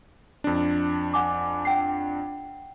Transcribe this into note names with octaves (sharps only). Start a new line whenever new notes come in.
F2 D4
F#5 G#5 D6
F#5 G5 C7